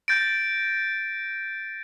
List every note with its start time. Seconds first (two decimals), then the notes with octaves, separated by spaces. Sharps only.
0.08 G6 A6 A#6 D7